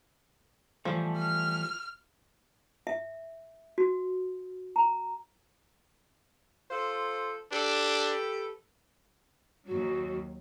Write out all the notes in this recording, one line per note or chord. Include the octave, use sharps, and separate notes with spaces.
E3 F3 G3 A3
F6
E5
F#4
A#5
F4 A4 C5
D4 G4 A4 B4
D#2 F#3 F#4